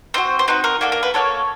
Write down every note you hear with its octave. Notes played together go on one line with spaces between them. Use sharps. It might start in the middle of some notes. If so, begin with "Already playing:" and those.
C4 D#4 F#4 C5
C5
C4 D#4 F#4 B4
A#4
A#3 D4 F#4 A4
A#4
B4
A#3 D4 F#4 A4 C#5